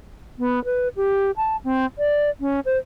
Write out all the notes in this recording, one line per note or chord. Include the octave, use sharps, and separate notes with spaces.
B3
B4
G4
A5
C4
D5
C#4
C5